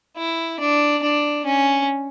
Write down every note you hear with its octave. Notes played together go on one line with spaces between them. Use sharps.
E4
D4
D4
C#4